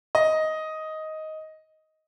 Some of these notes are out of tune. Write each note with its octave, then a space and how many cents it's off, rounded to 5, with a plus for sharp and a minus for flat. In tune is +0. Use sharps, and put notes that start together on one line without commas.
D#5 +10